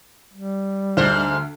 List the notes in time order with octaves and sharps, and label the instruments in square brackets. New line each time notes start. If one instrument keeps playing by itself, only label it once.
[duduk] G3
[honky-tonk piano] D2 [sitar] G#2 C5 [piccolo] F6